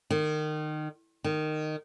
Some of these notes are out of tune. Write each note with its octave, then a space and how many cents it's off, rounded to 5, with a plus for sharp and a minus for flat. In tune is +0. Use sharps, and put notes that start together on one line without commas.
D#3 -25
D#3 -15